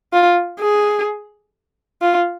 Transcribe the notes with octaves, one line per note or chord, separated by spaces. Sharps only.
F4
G#4
F4